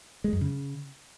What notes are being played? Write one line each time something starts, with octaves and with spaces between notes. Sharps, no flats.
G#3
F#2
C#3